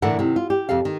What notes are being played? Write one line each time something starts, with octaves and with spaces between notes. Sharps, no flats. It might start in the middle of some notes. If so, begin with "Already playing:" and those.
A2 D3 E3 A3 A#4 F#5
C3 D#3
F4
G4
F2 C3 A4 F5
D#3